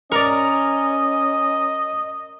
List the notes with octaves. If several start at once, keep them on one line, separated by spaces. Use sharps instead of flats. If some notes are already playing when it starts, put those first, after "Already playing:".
C#4 A#4 D5 D#5 C#6